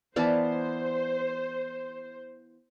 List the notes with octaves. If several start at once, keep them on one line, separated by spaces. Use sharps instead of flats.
E3 B3 C5 D5 F5 A5